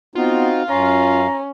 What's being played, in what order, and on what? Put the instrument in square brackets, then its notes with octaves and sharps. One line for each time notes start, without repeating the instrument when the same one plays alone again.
[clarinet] B3 [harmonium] C4 D#4 F#4 [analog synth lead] F4
[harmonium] F#2 F5 [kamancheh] C#4 [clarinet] A#5